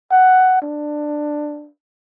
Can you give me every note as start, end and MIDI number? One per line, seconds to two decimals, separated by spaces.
0.11 0.59 78
0.62 1.69 62